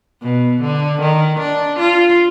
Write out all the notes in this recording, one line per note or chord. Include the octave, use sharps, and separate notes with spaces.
B2
D3
D#3
D4
F4